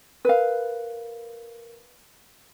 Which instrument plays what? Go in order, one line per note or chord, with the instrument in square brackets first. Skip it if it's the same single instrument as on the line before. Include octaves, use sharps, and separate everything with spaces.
[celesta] A#4 [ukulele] B4 F5